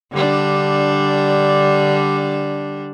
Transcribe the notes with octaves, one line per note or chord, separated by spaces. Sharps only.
D3 G3 D4